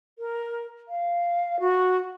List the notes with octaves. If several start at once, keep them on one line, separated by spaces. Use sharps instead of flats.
A#4
F5
F#4